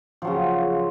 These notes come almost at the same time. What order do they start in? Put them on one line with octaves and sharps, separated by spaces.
F3 F#3 C#3